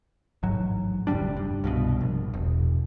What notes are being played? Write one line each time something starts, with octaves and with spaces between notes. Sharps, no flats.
A1 G#2 F#3
F1 D2 G3 D4
G2
C2 G2 B2
A#1
E1